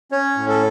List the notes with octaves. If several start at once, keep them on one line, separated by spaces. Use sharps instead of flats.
C#4 C#5
A2
A4